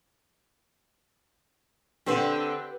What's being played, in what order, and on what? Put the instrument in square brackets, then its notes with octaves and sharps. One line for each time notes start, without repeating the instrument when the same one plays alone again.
[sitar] D3 C4 [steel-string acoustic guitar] G4 B4 F#5